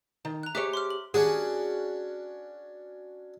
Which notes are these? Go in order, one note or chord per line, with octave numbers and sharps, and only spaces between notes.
D#3
A#5 F#6
G4 G#4 C#5 E5 D6 F#6
C6 D6 F6
F#7
C#4 D4 F#4 G#4